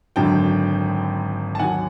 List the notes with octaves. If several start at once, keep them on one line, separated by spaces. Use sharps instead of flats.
G#1 F#2 D3 F#3 G5 A5
A5
D#2 D#3 F#3 F#5 G#5